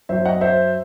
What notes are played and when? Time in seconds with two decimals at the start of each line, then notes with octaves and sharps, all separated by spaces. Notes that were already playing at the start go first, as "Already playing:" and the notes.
0.09 F#2 F#3 C5 E5
0.25 D#5 F#5
0.41 C5 E5